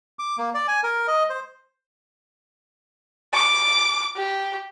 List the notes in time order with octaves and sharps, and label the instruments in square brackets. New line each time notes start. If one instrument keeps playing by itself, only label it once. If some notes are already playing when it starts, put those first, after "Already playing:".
[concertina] D6
A#3
D5
G#5
A#4
D#5
C5
[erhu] D6
G4